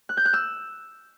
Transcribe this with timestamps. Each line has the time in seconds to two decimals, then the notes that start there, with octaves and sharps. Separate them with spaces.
0.09 F#6
0.17 G6
0.25 F#6
0.33 E6